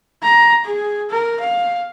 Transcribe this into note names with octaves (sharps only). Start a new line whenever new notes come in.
A#5
G#4
A#4
F5